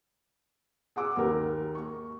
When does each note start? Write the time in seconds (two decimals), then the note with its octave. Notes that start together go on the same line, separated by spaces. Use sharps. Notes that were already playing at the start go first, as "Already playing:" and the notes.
0.96 G#4 F#5 D6 E6
1.16 D#2 A#4
1.75 C#6